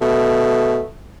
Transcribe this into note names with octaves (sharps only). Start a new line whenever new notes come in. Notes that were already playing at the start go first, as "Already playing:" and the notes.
B2 A3